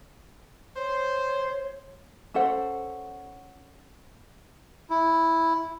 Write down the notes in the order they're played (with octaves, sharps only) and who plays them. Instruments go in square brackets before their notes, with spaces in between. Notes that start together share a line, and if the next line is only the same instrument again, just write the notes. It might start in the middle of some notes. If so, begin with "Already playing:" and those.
[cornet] C5 [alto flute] C#5
[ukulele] C#4 A4 C5 F#5
[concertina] E4